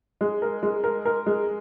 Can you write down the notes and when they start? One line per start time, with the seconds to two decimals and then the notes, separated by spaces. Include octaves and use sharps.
0.21 G#3
0.42 A#4
0.63 G#3
0.84 A#4
1.05 A#4
1.26 G#3